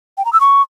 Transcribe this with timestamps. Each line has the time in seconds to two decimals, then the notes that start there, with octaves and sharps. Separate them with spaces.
0.18 G5
0.25 A#5
0.33 E6
0.41 C#6